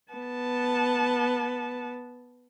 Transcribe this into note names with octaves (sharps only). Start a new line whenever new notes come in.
B3 A5